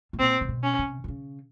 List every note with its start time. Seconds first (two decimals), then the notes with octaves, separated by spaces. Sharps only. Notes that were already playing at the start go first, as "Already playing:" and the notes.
0.13 A2
0.19 A#2 C4
0.41 C3
0.49 B2
0.63 C#4
0.79 C3
1.04 D3
1.08 C#3